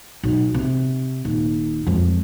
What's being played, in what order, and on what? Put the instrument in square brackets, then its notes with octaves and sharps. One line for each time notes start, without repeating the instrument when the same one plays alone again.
[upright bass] B1
C3
D#1
F2 G#3